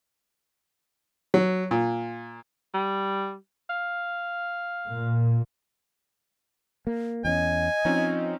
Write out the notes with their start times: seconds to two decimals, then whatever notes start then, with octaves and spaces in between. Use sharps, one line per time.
1.34 F#3
1.71 A#2
2.74 G3
3.70 F5
4.88 A#2
6.87 A#3
7.25 E2 C4 C#4 D#5 G#5
7.85 F3 C4 C#4 D#4